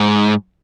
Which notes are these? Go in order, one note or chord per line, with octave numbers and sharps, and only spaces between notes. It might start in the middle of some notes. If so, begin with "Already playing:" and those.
Already playing: G#2